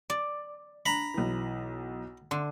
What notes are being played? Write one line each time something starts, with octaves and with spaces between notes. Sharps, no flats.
D5
D4 A#5 B5
B1 E3
D3 C6